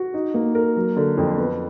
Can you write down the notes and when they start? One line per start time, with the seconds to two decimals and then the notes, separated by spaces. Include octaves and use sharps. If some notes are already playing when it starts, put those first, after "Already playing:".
Already playing: F#4
0.14 D#4
0.34 A#3
0.55 A#4
0.76 F#3
0.96 D3
1.18 F2
1.38 B3